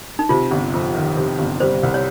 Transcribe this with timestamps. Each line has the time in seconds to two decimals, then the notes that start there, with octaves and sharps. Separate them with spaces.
0.19 D#4
0.29 C3 F4
0.51 G1
0.74 F2
0.95 D#3
1.17 C3
1.39 G1
1.60 G3 C5
1.83 C2
1.94 C#5